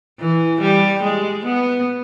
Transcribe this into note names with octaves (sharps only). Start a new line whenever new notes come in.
E3
G3
G#3
B3